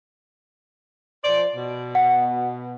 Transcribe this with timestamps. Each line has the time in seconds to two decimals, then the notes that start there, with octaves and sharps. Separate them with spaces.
1.24 F3 C5 D5
1.55 B2
1.95 F#5